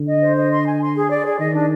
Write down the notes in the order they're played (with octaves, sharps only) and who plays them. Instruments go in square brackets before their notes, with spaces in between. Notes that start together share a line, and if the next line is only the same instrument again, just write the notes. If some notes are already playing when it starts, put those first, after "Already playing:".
Already playing: [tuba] D3
[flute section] D#5
C5
D#5
C6
G#5
C6
G#4
D5
G#4
[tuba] D#3 [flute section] D#5
[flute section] D4